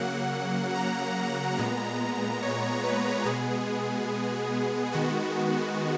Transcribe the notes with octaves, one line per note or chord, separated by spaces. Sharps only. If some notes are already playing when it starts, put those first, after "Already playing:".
Already playing: C#3 F#3 A#3 F#5
A#5
A#2 G#3 B3
C#5
B4
B2 G#3 B3 G#4
D#3 G#3 B3 F#4